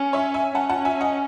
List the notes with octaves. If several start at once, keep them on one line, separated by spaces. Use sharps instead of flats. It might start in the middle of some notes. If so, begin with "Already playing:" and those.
Already playing: C#4
C#5 E5
E5 G#5
C#4 F#5 A5
F#5 A5
E5 G#5
D#5 F#5